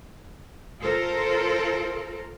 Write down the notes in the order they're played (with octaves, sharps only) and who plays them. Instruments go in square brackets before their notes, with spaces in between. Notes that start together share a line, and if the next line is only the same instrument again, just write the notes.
[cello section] F4 A4 A#4 C5